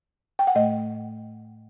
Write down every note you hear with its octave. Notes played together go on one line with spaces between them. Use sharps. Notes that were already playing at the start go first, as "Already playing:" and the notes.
G5
F#5
A2 A3 D#5